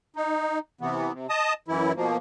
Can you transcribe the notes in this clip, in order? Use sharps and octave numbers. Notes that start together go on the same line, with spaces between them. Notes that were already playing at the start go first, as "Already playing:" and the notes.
D#4
C3 E3 B3
C3
D#5 A5 D#6
F#2 E3 E4
B2 F3 A#3